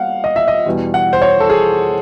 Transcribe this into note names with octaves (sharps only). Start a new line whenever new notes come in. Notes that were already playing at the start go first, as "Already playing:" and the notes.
Already playing: G3 A#3 F5 F#5
D#5
E5
D#5
E2 B2 G3
F#5
C5
C#5
A4
G#4